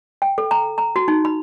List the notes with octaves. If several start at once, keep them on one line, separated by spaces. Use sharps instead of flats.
G5
A4
A#5
A#5
F#4
D#4
B5